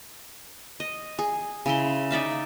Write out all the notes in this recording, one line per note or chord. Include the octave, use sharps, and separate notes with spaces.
D#5
G#4
C#3 E4 C6
D#4 D5 E5 F5